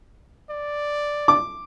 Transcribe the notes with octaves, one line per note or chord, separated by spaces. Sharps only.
D5
D6